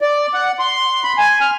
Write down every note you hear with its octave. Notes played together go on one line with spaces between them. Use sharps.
D5
F#5
C6
B5
G#5
F6